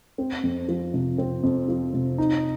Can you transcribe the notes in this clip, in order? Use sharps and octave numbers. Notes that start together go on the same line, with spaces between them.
C4
F2
F3
C3
C4
F2
F3
C3
D#4